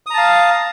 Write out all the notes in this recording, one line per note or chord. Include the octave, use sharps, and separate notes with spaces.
F5 A5 A#5 D#6